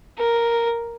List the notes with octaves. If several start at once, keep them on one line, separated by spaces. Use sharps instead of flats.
A#4